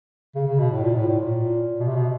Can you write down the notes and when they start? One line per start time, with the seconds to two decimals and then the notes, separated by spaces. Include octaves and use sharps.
0.35 C#3
0.47 C#3
0.59 B2
0.71 A2
0.83 A#2
0.95 A2
1.08 A2
1.19 A#2
1.80 B2
1.87 C3
1.95 B2